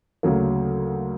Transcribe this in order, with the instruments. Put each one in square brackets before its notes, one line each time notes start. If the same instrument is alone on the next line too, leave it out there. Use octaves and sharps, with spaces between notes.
[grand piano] D2 C#3 F#3 A#3